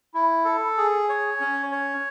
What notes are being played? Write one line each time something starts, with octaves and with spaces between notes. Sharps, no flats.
E4
A4
G#4
C#5
C#4
C#5